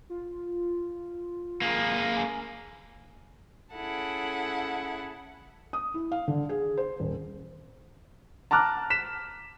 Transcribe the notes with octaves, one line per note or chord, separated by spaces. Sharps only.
F4
A#3 G#4
G#5
C#4 E4 G#4 A4 F#5 A5
D#6
E4
F5
D3
G#4
C5
D#1
A5 A#5 D6 F6 F#6
B6 E7